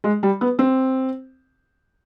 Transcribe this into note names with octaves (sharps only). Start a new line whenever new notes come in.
G#3
G3
B3
C4